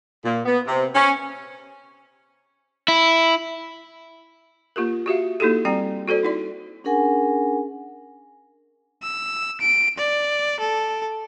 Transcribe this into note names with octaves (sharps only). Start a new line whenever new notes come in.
A#2
B3
C3
C#4
E4
A#3 F4 G4 A#4
F#4 G4 E5 F5
A#3 D#4 E4 F#4 G4 A4
G3 C4 G5 A#5
F#4 A4 C5 D5
D#4 E4 D5
C#4 D4 G#4 A#4 F#5 G#5
E6
D7
D5
A4